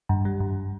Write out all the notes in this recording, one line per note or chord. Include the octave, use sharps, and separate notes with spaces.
G2
G3
G2